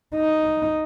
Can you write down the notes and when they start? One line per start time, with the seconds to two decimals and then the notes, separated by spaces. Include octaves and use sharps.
0.16 D#4